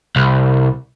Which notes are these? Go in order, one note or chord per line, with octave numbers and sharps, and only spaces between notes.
C2